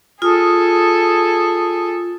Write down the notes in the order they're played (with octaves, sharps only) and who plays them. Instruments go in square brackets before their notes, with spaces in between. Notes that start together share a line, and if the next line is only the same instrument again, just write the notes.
[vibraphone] F4 D#6 [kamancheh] G#4 A4